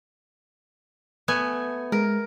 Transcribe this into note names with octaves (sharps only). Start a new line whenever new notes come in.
A3 B3 G#5
G#3 A#4